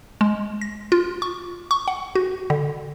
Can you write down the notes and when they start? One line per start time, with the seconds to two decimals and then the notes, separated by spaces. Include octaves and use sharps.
0.21 G#3
0.61 A#6
0.92 F4
1.22 C#6
1.71 C#6
1.88 F#5
2.15 F#4
2.50 D3